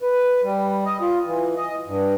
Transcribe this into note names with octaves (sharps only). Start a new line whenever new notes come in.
B4
G3
D#5
F4
E3
D#5
G2